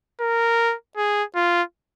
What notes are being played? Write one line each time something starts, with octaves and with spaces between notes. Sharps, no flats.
A#4
G#4
F4